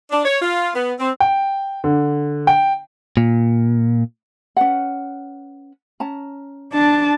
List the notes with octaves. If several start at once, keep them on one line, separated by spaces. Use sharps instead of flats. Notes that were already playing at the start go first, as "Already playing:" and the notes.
D4
C#5
F4
B3
C4
G5
D3
G5
A#2
C#4 B4 F#5
C#4 A5 A#5
D4 A5